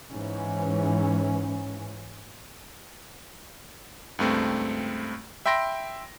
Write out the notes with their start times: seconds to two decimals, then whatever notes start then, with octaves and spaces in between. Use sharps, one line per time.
0.11 G#2 E3 C#4
4.19 C#2 G2 A3 C4
5.46 E5 G5 B5 C6 A#6 D7